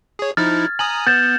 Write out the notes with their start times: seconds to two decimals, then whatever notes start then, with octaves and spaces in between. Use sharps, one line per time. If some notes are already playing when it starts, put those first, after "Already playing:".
0.19 G#4 C#5
0.37 F3 D#4 E4 F6 A6
0.58 G#6
0.79 G#5 A#5 D#6 F#7
1.07 B3 G6 A6 E7